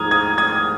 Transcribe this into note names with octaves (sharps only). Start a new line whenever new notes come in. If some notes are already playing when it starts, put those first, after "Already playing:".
Already playing: G#2 F3 A#5 D#6 F6 G#6
D#6 G#6
D#6 G#6